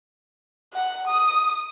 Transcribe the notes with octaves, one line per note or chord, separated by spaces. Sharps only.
F#5
D#6